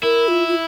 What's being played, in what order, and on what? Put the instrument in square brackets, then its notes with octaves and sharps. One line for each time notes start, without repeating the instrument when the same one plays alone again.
[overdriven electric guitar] E4 [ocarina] A#4
[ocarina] F4
F4